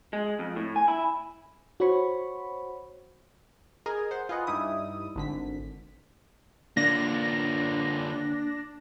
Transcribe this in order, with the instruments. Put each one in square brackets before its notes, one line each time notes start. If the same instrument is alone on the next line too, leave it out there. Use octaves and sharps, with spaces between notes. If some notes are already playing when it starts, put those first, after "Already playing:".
[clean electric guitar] G#3
F2
A2
G#5
E4
[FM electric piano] F#4 C5 C#5 B5 C#6
[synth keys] G#4 A#4 D#5 G#5 A#5
C5 F#5
F4 G#4 B4 D#5 F#5
G2 G3 D#4 E4 D#6
G#1 D3 B6
[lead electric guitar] D3 F4 [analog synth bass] A#3 [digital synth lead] D4 [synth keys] A#6